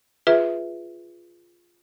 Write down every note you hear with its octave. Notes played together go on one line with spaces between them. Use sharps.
F4 G#4 B4 E5